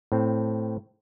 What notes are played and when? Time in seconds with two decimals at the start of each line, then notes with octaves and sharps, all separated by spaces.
0.12 A2 C4